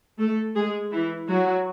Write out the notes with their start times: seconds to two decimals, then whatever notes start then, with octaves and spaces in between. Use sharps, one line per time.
0.19 A3 A4
0.55 G#3 G#4
0.91 E3 E4
1.28 F#3 F#4